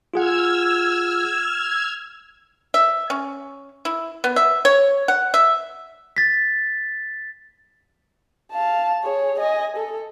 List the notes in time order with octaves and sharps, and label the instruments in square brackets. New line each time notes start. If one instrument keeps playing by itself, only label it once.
[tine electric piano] F4 G#4 F#5 [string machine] E6 F6 G#6
[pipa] E5
C#4
E4
B3
E5
C#5
F#5
E5
[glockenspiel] A6 B6
[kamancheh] F5 A5
G#4 C#5
D#5 G#5
A4